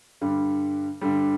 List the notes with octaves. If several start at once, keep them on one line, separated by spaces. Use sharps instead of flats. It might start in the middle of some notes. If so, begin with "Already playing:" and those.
G2 D3 G3
G2 D3 G3